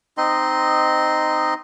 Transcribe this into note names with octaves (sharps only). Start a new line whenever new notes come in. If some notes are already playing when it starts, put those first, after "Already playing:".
C4 D#4 D#5 C6